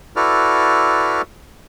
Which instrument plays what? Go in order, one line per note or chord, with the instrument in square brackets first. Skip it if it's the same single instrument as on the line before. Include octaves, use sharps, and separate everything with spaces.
[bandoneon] E4 F#4 A4 B4 D5 F6